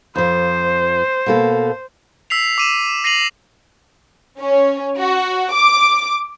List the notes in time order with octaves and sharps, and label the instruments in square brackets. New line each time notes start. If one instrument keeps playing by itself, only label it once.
[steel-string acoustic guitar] F2 F3 [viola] C5
[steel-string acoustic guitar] B2 A#3 A4
[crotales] E6 B6 C7 F7
D6 D#7 E7
A#6 C7 D#7 F7 F#7
[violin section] C#4
F#4
D6